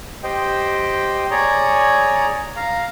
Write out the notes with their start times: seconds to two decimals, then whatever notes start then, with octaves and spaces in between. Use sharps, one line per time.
0.24 G4 C5 D#5 G5
1.31 G#4 C#5 D5 A#5
2.56 F5 A#5